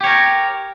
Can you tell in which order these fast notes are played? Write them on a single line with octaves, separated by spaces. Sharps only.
G4 C#5 A#4